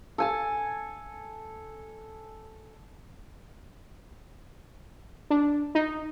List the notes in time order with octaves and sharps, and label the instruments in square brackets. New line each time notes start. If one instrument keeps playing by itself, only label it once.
[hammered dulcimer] A4 G#5 A5
[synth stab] D4
D#4